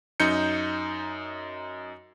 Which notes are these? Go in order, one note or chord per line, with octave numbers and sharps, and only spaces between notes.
F#2 D#4 G6 C#7